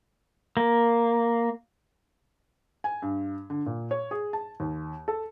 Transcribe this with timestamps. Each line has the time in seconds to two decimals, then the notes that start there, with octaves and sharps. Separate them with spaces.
0.57 A#3
2.84 G#5
3.02 G2
3.50 D3
3.66 A#2
3.91 C#5
4.11 G#4
4.33 A5
4.60 D#2
5.08 A4